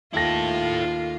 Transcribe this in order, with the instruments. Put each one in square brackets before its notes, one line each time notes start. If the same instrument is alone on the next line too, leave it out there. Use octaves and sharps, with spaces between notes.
[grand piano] D#2 A#6 [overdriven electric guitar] E4 A4 [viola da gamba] F4